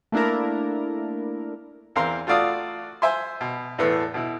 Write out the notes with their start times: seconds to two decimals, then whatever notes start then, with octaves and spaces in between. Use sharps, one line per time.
0.12 A3 A#3 D4 E4 A#4
1.96 E2 C4 A#4 F5 A#5 C6
2.27 A3 F4 F#4 D5 F5 D#6
3.02 C5 E5 G#5 C6
3.41 B2
3.78 E2 A2 A3 B3
4.14 B2 E4